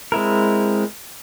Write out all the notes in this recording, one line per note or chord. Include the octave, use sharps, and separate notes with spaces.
G#3 C4 E4 A#4